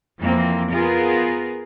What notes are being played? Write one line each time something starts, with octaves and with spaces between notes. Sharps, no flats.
F2 E3 A#3 C4
B3 F4 G#4 A#4